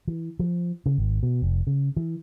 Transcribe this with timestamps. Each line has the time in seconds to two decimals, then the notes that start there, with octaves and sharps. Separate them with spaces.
0.07 E3
0.39 F3
0.86 C#3
0.98 G#1
1.23 B2
1.42 F1
1.67 C#3
1.97 E3